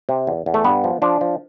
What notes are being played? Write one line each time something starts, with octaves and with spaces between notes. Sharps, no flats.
C3
E2
E2
A3
G2 B3
F3
F3 D4
F3